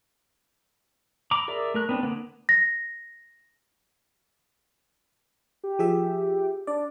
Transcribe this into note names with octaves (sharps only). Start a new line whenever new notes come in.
A#5 B5 D6
G#4 A#4 D5 E5
A3 A#4 F#6
B3 C4 D4
D3 A#3 B3
A#6
G4
F3 G#4 E5
D4 D5